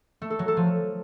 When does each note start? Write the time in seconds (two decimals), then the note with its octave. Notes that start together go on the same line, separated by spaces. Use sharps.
0.22 A3
0.30 A4
0.39 F#3
0.48 A4
0.57 F3